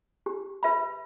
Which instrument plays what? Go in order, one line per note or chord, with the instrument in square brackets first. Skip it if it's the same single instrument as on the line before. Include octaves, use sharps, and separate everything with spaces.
[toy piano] G4
B4 E5 B5